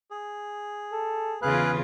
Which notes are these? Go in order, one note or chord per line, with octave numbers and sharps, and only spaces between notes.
G#4
A4
E2 C#3 F4 G#4 B4 F5 F#6